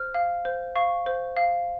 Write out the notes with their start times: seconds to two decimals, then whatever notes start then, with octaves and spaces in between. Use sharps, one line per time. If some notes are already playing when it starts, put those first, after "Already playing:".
Already playing: C5 F6
0.14 F5
0.45 C5
0.76 F5 C#6
1.06 C5
1.36 F5